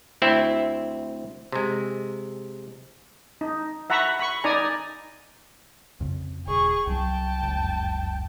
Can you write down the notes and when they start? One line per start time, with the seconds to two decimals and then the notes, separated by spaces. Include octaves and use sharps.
0.22 D2 C4 E4 E5
1.52 C3 G#3
3.41 D#4
3.90 E5 F#5 A#5 B5 C#6
4.20 B5 C#6
4.44 D#4 D5 G#5 A#5
6.01 F2 C#3
6.47 D#1 G#4 C#6
6.87 C2 F#3 G5 A5
7.42 F1 C#2 F#2